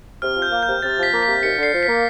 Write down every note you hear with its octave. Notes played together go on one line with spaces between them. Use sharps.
C3 F6
F3
G6
A#3
C3 G6
C3 A6
F3 B6
A#3
C3 B6
D#2 C#7
D3 C7
F3
B6
A#3